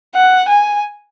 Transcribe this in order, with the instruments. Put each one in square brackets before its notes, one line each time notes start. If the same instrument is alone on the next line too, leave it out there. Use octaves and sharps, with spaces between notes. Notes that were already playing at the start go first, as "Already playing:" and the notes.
[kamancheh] F#5
G#5